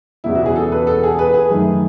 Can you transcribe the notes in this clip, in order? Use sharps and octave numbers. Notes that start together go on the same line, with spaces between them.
E1 E2 C#3 E4
F#4
G#4
A4
B4
A4
G#4
B4
G#4
F#2 D#3 A3